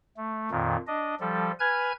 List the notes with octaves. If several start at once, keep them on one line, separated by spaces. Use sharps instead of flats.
A3
F2 A#2 D#3
D4 D#5
F3 G3 A4
B4 G#5 F6 G#6